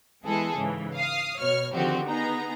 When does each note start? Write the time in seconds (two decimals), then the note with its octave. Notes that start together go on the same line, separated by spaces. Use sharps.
0.24 E3 G#3 B3 G#4 A4
0.56 G#2 C#3 E3
0.96 F5 D#6
1.39 B2 C#5 F6
1.74 D3 D#3 F3 C4 F#4 G4
2.06 B3 D#4 G#4 A#5